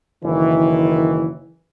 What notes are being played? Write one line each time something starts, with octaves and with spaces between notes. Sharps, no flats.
F#1 D#3 E3